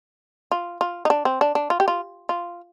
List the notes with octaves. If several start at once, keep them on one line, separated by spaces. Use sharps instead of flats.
F4
F4
D#4
D4
C4
D4
D4
F4
G4
F4
F4